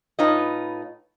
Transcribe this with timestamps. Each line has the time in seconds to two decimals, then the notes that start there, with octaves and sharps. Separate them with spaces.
0.19 A2 D#4 F4 B4 C#5 D#5